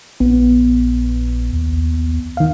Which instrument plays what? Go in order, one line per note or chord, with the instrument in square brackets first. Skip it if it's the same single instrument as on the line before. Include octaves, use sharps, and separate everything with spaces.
[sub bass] A#1 [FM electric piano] B3
[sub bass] D#2
[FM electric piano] D#3 F5